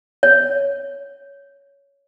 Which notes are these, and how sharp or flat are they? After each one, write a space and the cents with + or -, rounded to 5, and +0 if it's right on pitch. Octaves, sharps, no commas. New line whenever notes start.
C#5 +10